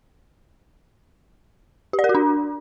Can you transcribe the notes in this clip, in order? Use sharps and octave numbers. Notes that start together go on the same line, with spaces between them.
G4
D5
A#4
F#4
D4